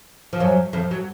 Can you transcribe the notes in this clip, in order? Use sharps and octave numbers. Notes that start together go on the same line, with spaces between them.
F3
F#2 F#3
F2 F3
F#3